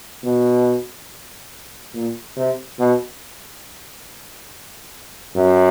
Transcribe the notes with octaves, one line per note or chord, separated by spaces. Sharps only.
B2
A#2
C3
B2
F#2